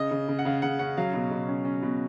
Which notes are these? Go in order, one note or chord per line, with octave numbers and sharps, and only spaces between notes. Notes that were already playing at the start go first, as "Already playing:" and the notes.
Already playing: C#3 D#5
C#3
C#3
F#5
C#3 F5
C#3 F#5
C#4 F#5
F#3 F5
B2
B2
C#4
C#4
B2